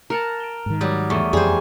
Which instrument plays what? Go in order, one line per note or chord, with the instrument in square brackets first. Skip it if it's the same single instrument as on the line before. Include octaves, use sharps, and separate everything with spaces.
[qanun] A#4 F#5 A5 [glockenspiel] A#5 F6 F7
[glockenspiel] D7 E7 G7
[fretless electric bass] G#2 D#3
[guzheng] F#3 G3 [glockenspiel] D6 D#6
[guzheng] E2 [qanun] A3 [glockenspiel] C#6 D#7
[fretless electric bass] F2 [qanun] G3 [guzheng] G#4 C5 [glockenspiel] G7